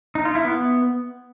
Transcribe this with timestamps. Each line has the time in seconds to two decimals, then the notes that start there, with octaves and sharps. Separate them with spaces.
0.15 D#4
0.25 F4
0.35 E4
0.45 B3